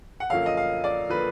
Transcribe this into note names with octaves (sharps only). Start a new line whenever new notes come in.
F#5
F#2 D3 F3 A#3 F5
D#5
F5
D5
D3 F3 A#3 B4